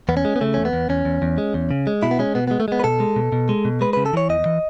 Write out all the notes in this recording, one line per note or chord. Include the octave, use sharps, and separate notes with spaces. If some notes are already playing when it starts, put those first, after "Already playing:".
E2 B3
C#4
G#3
B3
C#3 A3
E2 C#4
B3
E2
E2 C#4
E2
E2
G#3
E2
C#3
G#3
B2 E4
B3
G#3 C#4
B2 B3
G#3 B3
A3
G#3 B3
B4
B2 A4
G#3
B2
B2
G#3
B2
G#3 B4
C#3 B4
A4
E3 C#5
E2 D#5
E3